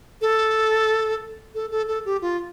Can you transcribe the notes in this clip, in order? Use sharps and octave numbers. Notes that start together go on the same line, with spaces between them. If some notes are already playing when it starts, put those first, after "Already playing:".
A4
A4
A4
A4
G4
F4